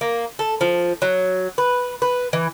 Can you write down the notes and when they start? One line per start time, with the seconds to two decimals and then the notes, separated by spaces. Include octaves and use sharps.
0.01 A#3
0.39 A4
0.61 F3
1.02 F#3
1.58 B4
2.02 B4
2.33 E3